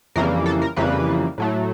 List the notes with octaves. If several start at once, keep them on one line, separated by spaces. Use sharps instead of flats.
F2 C#3 E3 G3 A#3 A#4
A4
A#4
F2 C#3 E3 G3 A#3 B4
A2 F#3 A3